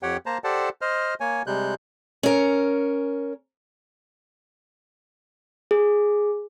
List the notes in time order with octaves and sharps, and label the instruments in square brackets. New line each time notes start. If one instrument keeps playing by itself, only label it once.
[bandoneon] F2 G4 C#5 F#5 G5
A#3 C5 A5 A#5
G4 A4 C5 D5 F#5 A5
C5 D#5 F6
A#3 C#5 G#5
C3 G3 G#3 F#6 G6
[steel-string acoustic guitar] C#4 A#4
[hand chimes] G#4